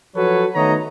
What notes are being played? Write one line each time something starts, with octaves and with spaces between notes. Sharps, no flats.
F3 F#3 F#4 A4 B4 C#5
D#3 A3 B3 C#5 D#5 A#5